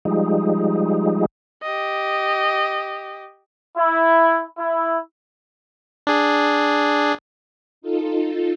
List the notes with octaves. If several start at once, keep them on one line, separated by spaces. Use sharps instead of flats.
F3 G3 G#3 D#4
G4 D#5
E4
E4
D4 G#4
D#4 F4 A4